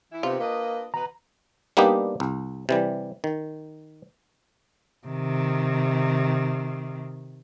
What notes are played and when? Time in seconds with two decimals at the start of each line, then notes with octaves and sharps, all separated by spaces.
0.12 E3 E4
0.23 C3 D#3 B3 F4
0.40 A#3 D4 B4 D#5
0.94 B2 B4 A#5
1.77 G3 A#3 B3 D4 D#4 G4
2.20 C2
2.69 C3 E3 G3
3.24 D#3
5.07 C3 D#3